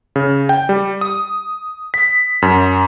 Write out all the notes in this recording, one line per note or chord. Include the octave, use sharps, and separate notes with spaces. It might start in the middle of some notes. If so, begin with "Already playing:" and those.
C#3
G5
G3
D#6
B6
F#2